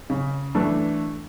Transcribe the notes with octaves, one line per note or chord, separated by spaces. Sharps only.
C#3
E3 A3 D4